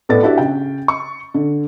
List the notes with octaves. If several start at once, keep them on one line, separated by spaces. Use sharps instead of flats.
A2 B3 A4 B4 D5 A6
D4 E4 F#4 G4 E5
C#3 G5
C#6
D3